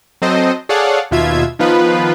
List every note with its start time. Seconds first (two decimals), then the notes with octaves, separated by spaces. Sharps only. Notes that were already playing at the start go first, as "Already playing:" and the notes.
0.22 F#3 C4 A4 C5 D#5
0.69 G#4 A4 C#5 D5 F5 F#5
1.11 D#2 B2 F4 E5 G#6
1.59 D#3 F3 B3 F4 B4